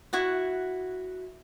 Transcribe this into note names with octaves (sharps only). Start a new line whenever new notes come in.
E4 F#4 F#5